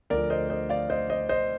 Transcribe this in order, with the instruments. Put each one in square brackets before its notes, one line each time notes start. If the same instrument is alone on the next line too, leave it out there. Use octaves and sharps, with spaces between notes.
[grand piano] D2 D3 F3 A#4 D5
C5 D#5
C5 D#5
D5 F5
C5 D#5
C5 D#5
C5 D#5